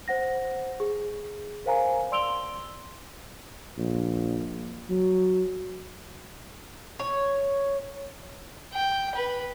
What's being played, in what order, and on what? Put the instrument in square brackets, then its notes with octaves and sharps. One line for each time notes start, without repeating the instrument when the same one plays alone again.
[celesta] C5 F#5 A#6
G#4
A#4 C5 F5 G#5 A#5
D5 C6 E6 D7 F7 G7
[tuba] A#1
F#3
[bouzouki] C#5
[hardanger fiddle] G5
B4